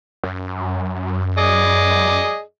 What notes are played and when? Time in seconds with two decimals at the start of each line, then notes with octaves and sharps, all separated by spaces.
0.24 F#2
1.38 G#4 D5 D#5